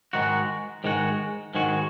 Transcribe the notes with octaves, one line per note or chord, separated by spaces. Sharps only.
G#2 D#3 G#3 F#4
G#2 D#3 G#3 F#4
G#2 D#3 G#3 F#4